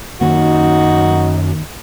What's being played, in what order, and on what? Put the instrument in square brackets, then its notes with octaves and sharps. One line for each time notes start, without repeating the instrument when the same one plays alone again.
[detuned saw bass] F#2 [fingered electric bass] D#3 A#3 [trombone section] D#4 [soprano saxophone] F#4